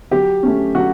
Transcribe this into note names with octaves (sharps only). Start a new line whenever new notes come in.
F#3 G4
A3 C#4
F#3 F#4